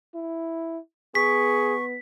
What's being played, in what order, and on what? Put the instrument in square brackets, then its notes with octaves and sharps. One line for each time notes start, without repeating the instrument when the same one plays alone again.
[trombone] E4
[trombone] B3 [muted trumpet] G#4 [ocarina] C#6 [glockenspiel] B6